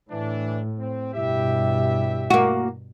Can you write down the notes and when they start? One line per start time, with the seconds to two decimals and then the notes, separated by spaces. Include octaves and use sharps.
0.11 A2 E3 D4
0.79 C4
1.14 G2 B2 E4 G4 E5
2.30 A#3 F#4